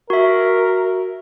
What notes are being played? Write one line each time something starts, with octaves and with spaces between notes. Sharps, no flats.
F#4 A#4 E5